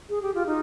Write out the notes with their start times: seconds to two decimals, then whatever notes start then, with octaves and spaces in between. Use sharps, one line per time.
0.09 G#4
0.22 G4
0.34 F4
0.46 D#4